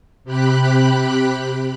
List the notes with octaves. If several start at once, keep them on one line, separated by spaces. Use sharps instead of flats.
C3 G4 B5 F#6